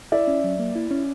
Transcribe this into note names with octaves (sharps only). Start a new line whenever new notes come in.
E4 D5 E5
C#4
F#3
A#3
E4
C#4